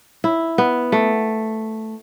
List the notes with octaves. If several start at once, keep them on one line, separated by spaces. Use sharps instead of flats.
E4
B3
A3